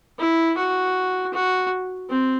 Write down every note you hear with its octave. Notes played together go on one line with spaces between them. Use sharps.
E4
F#4
F#4
C4